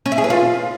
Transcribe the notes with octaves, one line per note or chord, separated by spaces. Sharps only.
C#4
E4
G#4
B4
F4